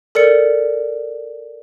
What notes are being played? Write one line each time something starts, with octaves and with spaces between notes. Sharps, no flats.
A4 A#4 D5 C#7